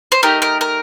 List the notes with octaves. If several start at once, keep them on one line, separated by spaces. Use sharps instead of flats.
C5
A3 D#4 G4 A#4
A#4
A#4